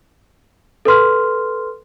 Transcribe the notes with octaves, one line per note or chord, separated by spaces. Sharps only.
A4 B4 C6 F6